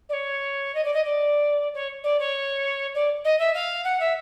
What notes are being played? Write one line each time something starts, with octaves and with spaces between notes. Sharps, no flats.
D5
C#5
D#5
D5
D#5
D5
C#5
D5
C#5
D5
D#5
E5
F5
F#5
E5